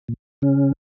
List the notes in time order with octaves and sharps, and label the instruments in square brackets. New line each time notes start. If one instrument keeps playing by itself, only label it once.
[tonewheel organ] A#2
C#3 C#4